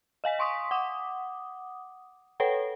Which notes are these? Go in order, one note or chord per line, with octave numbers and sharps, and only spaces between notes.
D#5 F5 G#5 B6
G#5 C6 C#6 D#6 B6
F#5 D6 D#6
A4 B4 C#5 F#5 G5